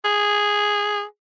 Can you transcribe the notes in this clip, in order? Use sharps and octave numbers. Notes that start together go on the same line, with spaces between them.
G#4